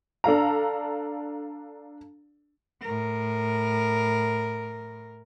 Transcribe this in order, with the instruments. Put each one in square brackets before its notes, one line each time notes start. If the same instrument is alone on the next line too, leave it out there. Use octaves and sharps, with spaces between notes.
[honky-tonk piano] D4 A4 F5 A#5
[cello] A2 A#4